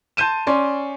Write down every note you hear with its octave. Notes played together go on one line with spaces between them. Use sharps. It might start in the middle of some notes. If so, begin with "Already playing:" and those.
A5 C6 G6 D#7 E7
C#4 D5 C6